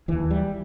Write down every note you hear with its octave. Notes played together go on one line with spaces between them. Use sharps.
E1 D#2 E3
G3